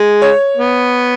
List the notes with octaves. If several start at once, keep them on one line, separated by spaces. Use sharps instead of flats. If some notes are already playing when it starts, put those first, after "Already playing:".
Already playing: G#3
C#5
B3